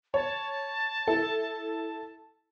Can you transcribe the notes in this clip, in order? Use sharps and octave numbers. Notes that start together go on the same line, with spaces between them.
C#5 A5
E4 A4